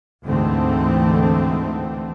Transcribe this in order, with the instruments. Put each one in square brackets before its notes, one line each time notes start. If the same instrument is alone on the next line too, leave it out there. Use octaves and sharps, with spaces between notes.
[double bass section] D2 G#2 D3 E3 A3 C4